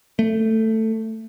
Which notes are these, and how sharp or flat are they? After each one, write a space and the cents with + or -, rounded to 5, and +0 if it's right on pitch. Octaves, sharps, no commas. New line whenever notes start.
A3 +10